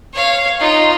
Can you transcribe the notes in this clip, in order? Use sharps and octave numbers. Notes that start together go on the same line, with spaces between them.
C#5 F5
D#4 F4